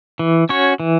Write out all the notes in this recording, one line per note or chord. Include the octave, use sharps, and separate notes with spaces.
E3
C#4 F#4 C#5
E3